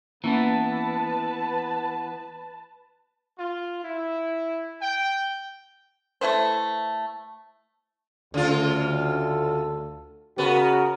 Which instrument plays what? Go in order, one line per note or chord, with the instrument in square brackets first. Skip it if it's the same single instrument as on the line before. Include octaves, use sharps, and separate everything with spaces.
[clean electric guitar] E3 B3 [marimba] A#3 C#4 [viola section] B4 A5
[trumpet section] F4
E4
G5
[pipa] A3 E4 B4 C5
[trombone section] D2 A4 [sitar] C#3 F4
[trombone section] C#3 F#4 A#4 [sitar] B3